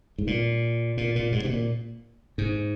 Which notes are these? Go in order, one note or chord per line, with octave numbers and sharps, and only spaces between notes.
G#2
A#2
A#2
A#2
G#2
C3
A#2
G#2